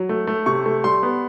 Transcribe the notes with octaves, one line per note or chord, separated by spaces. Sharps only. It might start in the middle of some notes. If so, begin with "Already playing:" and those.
Already playing: F#3
A3
A3
C3 C#6
A3
G3 C6
B3